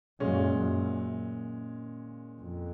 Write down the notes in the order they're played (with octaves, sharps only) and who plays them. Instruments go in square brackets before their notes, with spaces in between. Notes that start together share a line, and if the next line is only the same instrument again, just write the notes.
[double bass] F#2 [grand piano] A#2 G#3 C#4
[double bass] F#2
F2